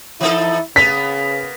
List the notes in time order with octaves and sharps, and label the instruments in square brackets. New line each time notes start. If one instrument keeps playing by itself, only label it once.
[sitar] E3 D#4 A4 [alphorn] E4
[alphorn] C#3 [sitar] A#3 B3 [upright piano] B6